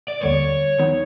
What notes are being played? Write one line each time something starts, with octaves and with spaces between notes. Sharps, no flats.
D5
D#2 D3 G3 C#5
D#3 F#3 B3 D#4